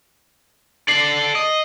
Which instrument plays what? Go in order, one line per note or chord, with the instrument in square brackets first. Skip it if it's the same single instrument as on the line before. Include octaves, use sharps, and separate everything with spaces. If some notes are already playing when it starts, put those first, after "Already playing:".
[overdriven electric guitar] A4 D5 [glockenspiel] C7 F#7
[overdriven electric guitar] D#5